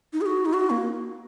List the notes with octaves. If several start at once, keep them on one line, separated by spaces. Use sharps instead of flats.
D#4
G#4
F#4
D#4
F#4
A#3